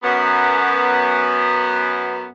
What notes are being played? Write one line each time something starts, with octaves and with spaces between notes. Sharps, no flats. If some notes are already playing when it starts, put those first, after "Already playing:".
F#2 B3